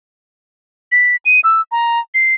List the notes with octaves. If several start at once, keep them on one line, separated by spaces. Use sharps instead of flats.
B6
D#7
E6
A#5
C7